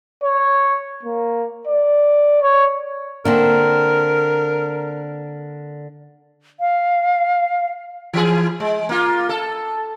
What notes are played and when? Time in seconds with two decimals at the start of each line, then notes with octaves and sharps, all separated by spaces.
0.24 C#5
1.03 A#3
1.67 D5
2.42 C#5
3.25 D3 A#3 C4 A#4
6.60 F5
8.13 E3 G#4
8.60 G#3
8.89 A#3 F4
9.29 A4